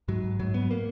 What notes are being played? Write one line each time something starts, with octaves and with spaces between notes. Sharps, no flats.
G#2 F#3
G#2 F#3
B3
A#3